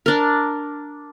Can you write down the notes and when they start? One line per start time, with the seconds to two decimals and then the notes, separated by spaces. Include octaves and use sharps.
0.06 D4 A#4